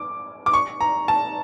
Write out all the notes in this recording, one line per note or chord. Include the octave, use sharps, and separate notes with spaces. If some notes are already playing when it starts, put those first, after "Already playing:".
Already playing: D6
D6
C#6
A#5
A5